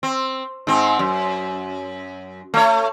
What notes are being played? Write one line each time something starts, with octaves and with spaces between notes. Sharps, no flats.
C4
G#2 C4
F#2
A3 C#5